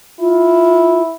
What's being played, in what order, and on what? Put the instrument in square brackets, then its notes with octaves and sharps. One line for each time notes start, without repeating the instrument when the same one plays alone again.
[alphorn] E4 [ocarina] F4